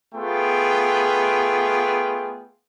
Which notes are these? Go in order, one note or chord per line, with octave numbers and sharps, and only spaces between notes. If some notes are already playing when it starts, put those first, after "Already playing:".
A3 B3 F4 G#4 G5